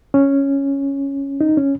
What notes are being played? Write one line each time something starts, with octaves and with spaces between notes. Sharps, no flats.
C#4
D#4
C#4